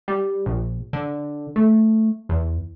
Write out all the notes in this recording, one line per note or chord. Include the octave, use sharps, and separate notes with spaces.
G3
A#1
D3
A3
E2